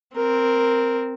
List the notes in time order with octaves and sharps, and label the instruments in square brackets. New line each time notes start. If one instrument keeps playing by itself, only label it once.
[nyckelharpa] C4 A#4